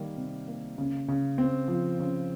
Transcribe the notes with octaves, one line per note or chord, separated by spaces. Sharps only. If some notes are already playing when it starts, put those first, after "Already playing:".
Already playing: D#3 G3 A#3
C3
A#3
C#3
C#3
C4
F3
C#3